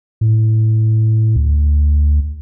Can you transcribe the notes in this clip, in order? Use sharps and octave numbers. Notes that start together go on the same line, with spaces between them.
A2
D2